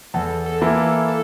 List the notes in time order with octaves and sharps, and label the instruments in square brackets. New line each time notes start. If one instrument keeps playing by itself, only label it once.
[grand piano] E2 [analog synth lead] A4
[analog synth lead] A4
[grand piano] E3 A#3 E4
[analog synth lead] A4
A4